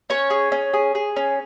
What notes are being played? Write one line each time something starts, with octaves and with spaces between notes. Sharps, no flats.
C#4 C#5
G#4
C#4
G#4
G#4
C#4